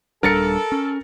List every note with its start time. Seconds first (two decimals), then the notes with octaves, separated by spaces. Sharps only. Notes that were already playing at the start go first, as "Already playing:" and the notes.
0.23 D#1 G3 D4 A4 A#4 A6 C#7
0.72 C#4